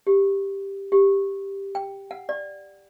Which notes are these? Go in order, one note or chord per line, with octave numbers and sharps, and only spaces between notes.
G4
G4
G5
F#5
D5